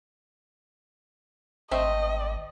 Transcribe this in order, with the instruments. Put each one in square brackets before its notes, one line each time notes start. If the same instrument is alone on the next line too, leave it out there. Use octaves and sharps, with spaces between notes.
[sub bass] G#1 [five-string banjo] A3 C4 E5 [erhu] D#5